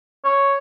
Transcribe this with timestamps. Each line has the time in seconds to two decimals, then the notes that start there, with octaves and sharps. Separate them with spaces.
0.24 C#5